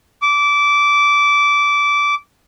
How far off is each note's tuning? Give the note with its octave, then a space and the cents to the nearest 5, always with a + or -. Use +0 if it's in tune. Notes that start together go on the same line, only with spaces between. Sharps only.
D6 -15